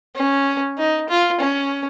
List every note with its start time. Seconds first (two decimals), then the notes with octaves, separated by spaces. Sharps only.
0.15 C#4
0.77 D#4
1.09 F4
1.40 C#4